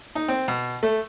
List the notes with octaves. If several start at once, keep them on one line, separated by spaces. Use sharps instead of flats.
D#4
C4
B2
A3